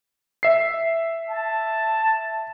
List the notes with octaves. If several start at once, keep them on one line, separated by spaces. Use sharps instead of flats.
E5 C7
A5